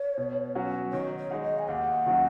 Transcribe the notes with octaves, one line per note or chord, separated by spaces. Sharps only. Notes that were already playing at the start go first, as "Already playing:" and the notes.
Already playing: C#5
B2
F#3 C#4 F#4
D#3 C#5
C#5
G#3 D#4 F#4
D#5
G#5
D#2 F#5
D#3 F#3 C#4 F#4